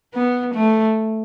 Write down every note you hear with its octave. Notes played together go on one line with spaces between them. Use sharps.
B3
A3